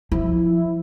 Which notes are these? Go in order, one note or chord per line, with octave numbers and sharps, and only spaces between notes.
F3 E4